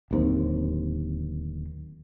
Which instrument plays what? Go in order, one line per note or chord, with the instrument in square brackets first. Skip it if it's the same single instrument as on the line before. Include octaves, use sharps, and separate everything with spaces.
[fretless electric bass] D1 D#2 C4